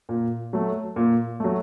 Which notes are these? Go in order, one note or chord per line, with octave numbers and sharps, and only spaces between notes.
A#2
F#3 A3
A#2
F#3 A3